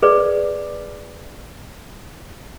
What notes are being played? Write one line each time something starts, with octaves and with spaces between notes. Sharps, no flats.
G#4 B4 D5